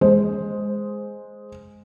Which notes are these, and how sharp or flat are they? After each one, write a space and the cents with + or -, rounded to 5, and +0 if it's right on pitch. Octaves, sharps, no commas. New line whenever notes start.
G#3 +0 C5 +0